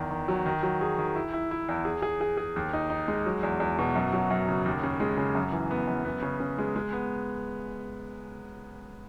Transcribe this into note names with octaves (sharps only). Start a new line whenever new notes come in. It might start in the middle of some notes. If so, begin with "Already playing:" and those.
Already playing: E2 D#3
D#3
F#3
D#3
F#3
G#4
D#3
E4
E4
E4
E2
G#4
G#4
G#4
G#4
D#2
D#4
D#4
G#3
F#3
E2
E2
B2
F#2
F#3
F#2
C#3
D#2
C#3
G#3
C#3
F#2
E3
B3
F#2
B3
C#3
C#3
G#3
G#3
B3